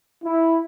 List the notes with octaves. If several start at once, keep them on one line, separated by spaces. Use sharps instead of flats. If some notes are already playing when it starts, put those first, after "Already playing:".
E4